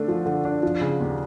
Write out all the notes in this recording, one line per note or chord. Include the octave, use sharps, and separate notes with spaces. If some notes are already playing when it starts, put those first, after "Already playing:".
Already playing: D3 A3 D4
F3
D3
D4
F3
C#3
D#2